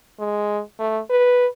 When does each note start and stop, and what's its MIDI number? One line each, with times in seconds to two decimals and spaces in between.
0.19 0.60 56
0.79 0.99 57
1.10 1.47 71